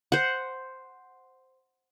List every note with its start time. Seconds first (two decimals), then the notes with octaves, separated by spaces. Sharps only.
0.12 C5 F#5